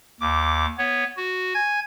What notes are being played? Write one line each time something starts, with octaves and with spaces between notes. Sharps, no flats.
D#2 D6
B3 C#5
F#4
G#5 G#6